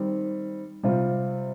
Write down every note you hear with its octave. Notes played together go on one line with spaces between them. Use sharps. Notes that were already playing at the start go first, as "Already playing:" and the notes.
Already playing: D#3 G3 C4
C3 G3 C4 F4